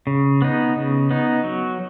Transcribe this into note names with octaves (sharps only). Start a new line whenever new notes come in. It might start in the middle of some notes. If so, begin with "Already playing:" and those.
C#3
B3 D#4
C#3
B3 D#4
F#3